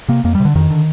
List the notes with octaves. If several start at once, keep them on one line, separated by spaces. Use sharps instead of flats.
C3 A#3
F2 A#3
G3
C3
D3
F2 D#3
D3